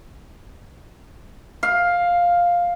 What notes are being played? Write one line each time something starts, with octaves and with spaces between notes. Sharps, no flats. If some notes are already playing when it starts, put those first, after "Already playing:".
F5